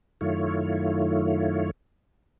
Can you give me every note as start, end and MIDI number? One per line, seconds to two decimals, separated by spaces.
0.21 1.71 42
0.21 1.71 51
0.21 1.71 57
0.21 1.71 64
0.21 1.71 65
0.21 1.71 73